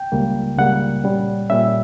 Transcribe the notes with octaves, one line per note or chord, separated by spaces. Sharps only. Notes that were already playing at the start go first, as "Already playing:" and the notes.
Already playing: G5
C#2 C#3 G3 A#3
C#2 C#3 G3 A#3 F#5
A#2 G3 C#4
A#2 G3 C#4 E5